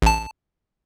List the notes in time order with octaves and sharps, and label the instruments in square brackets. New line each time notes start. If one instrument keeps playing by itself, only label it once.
[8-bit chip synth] A1 A5